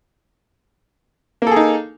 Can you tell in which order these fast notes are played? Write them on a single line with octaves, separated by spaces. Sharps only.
A#3 A4 G#4 D#4